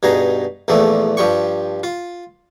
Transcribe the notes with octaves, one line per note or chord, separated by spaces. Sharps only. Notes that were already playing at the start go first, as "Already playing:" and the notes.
G2 B2 D#4 G#4 A#5
A#1 E2 E3 F3 A3
G2 F3 G3 G5 C#6
F4